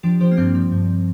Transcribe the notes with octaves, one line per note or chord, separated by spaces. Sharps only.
F3 D4 G4
F3 G4 C5
A#3
G2 G3 C4
F3
G2